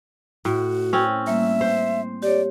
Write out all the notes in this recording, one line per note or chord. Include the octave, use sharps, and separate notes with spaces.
A2 F#4
C4 C#4
G3 A#3 E5
C5
G4 C#5 D5